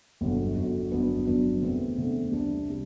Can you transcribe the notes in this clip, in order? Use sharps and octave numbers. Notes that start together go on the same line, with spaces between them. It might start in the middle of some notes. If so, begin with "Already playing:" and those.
G1 F#2 D3 F#3
G1 F#2 D3 F#3
G1 F#2 F#3 B3 D4
G1 F#2 F#3 B3 D4
E2 D3 A3 C4
E2 D3 A3 C4
C2 C3 G3 D4
C3 G3